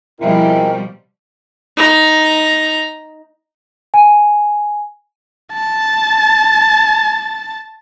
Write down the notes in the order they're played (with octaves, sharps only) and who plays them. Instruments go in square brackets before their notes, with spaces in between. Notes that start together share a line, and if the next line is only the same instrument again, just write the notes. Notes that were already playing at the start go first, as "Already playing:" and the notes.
[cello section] B2 F3 G3 [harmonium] G#3 C4 A#4 [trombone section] E4
[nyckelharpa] D#4 A#5
[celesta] G#5
[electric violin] A5 A6